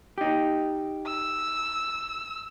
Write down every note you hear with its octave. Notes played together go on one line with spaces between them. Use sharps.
D#4 G4
E6